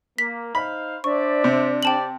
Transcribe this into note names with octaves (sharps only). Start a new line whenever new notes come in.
A#3 B6
D#4 C5 F5 B5
D4 C5 D5 E5 C#6
C3
C4 G4 D5 G5 A5 F#7